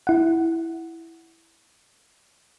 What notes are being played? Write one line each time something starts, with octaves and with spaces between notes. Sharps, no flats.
E4 F#5